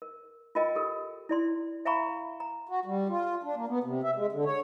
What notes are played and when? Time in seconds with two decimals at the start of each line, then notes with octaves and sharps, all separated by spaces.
0.02 A#4
0.55 F4 F#4 A#4 D#5 G5
0.75 G4 A4 A#4
1.29 E4 D5 C6
1.85 E5 F5 G5 A#5 B5 C#6
2.40 A#5
2.69 F#4
2.86 G3
3.09 F4
3.43 D4
3.56 A#3
3.68 B3
3.84 C3
4.04 E5
4.15 G#3
4.32 D3
4.45 C#5